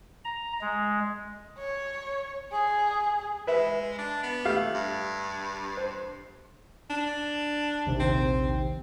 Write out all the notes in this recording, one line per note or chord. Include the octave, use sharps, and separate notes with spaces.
A#5
G#3
C#5
G#4
G#3 B4 E5
D4
B3
A3 G4 F5
G2
C5
D4
A#1 D#2 C3
C4